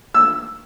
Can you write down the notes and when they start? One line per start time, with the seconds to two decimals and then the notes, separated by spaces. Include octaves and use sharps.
0.14 E6